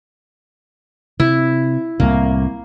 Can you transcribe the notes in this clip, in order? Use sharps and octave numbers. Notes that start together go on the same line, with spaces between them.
C3 E4
C2 A2 A#3